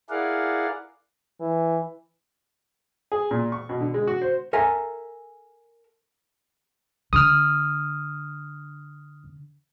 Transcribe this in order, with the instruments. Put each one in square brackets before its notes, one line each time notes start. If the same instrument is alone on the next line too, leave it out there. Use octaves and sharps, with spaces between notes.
[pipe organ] E4 G#4 A#4 D5 F5 F#5
[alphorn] E3
[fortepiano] G#4
A#2
C#6
B2
D3
G#3
F#4
C5
[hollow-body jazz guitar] A4 A#4 E5 G#5
[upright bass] D3 [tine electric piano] D#6 F6